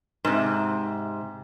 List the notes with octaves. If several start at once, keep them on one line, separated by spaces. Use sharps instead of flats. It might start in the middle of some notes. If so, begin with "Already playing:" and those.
G#2 C3